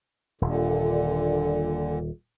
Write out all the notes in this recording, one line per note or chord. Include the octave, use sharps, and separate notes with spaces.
D#1 A#2 D3